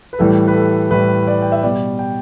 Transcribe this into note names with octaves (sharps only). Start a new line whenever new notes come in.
B4
A2 E3 G3 A4
B4
A4
A2 E3 G3 B4
D5
G5
E5
B2 G3 D5
G5